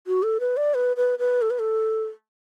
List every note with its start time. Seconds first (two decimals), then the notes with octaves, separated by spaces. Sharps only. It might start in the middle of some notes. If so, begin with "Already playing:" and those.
0.07 F#4
0.23 A4
0.40 B4
0.57 D5
0.74 B4
0.97 B4
1.19 B4
1.42 A4
1.50 B4
1.59 A4